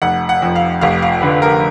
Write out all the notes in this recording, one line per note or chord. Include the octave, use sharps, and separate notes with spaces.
F1 F#5
F#5
F2
F5
F1 F5
F5
D3 B4
A#4